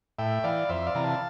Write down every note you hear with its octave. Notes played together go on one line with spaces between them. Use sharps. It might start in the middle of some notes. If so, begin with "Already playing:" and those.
A2 E5 G5
E3 D5 F5
F2 C5 E5
D5 F5
C3 E3 A#5
F5 A5